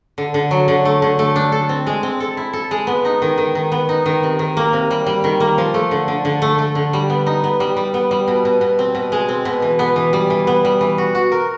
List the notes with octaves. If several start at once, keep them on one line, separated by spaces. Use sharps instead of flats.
D3
D3
F#3
D3
A3
D3
A3
D4
A4
C4
G#3
C4
A4
E4
A4
G#3
B3
D#4
D#3
D#3
D#3
B3
D#4
D#3
C3
D#3
A#3
C3
G3
G3
D#3
A#3
F3
A3
D3
D3
D3
A3
A3
D3
G3
B3
D#4
B3
G3
G3
B3
G3
B2
B2
B2
C4
B2
G#3
C4
B2
E3
B3
E3
G3
E3
B3
G3
E3
F#4
F#4
A#4